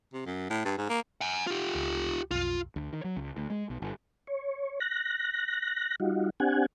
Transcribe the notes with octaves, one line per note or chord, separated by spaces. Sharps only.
C3
F#2
A2
G2
G#2
A#3
F#5 G#5
F4 G4
C#2
B1 F2 F4
D2
D#3
F#3
C#2
D2
G#3
B1
G1
C#5
F#6 A#6
G3 D#4 F4 F#4
C4 D4 G4 F#5 G#5